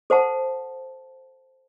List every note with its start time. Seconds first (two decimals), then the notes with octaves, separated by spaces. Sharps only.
0.10 A4 C5 F#5 A5